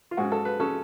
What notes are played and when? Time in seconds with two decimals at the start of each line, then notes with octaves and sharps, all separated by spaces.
0.11 F4
0.17 G#2 G#3 C#4 F#4
0.32 A4
0.45 B4
0.60 G#3 C#4 A4